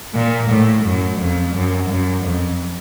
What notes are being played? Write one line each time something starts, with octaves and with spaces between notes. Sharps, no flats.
A#2
A2
F#2
F2
F#2
F#2
F2